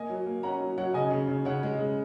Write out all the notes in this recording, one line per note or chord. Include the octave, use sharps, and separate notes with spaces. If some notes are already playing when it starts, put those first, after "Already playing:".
Already playing: A#3 D#5 G#5
F#3
A#3
C#4 F#5 A#5
F#3
F#3 C#5 F#5
C#3 D#5 G#5
C#3
C#3
C#3 C#5 F#5
G#3
C#3